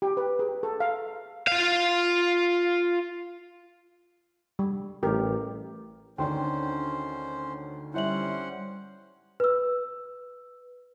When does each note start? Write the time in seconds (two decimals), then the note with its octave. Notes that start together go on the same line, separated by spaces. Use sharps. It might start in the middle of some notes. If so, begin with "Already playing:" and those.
0.02 G4
0.17 B4
0.39 G#4
0.63 A4
0.80 F5
1.47 F4 F5
4.59 G3
5.03 A1 G4 A#4
6.18 D2 D#3 C#4 D4 C5 G5 C6
7.94 G3 C#4 E4 C5 E5 F#5 F#7
9.40 B4 E6